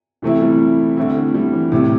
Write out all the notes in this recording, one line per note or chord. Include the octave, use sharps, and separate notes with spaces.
C3 E3 A3 C4 E4
G3
D3 A3 C4 E4
G3
E3
A2 C3 G3 E4